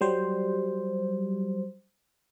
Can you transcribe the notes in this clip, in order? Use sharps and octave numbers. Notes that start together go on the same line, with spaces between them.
F#3 G3 C5